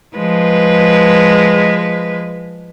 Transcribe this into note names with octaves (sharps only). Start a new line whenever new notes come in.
F3 G#3 B4